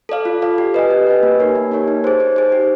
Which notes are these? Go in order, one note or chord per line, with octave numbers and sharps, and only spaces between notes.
A4 D5 F5
F4
A4 D5 F5
G4
B4 D#5 G#5
G4
B4 D#5 G#5
A#3
D#4 G4 A#4 C#5
A#3
D#4 G4 A#4 C#5
D#4
G#4 C5
D#4
G#4 C5
G4